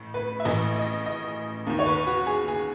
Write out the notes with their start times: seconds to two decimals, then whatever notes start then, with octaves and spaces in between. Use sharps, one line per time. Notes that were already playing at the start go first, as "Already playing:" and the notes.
Already playing: A1 A2
0.14 B4
0.40 E5
0.45 A1 A2 E3 D#5
0.76 D#5
1.06 D#5
1.67 D#2 D#3
1.79 C#5
1.86 B4
2.07 F#4
2.27 G#4
2.48 G#4